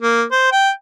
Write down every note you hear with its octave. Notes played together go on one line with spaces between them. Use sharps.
A#3
C5
G5